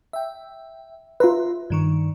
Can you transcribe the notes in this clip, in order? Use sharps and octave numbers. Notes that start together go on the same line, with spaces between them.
E5 G5
F4 B4 E5 A#5 C6
G2 D#3 C#6